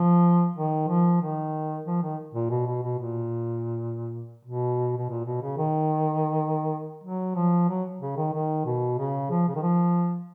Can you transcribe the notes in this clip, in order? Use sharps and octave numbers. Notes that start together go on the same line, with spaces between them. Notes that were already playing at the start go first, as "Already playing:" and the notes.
Already playing: F3
D#3
F3
D#3
F3
D#3
A#2
B2
B2
B2
A#2
B2
B2
A#2
B2
C#3
D#3
F#3
F3
F#3
C#3
D#3
D#3
B2
C#3
F3
C#3
D#3
F3